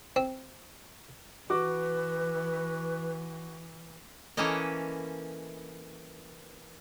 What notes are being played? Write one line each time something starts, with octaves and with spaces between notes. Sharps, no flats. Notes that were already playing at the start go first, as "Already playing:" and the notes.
C4
E3 F#4 B4 D6
E3 A#3 C#4 A4 B4 D#5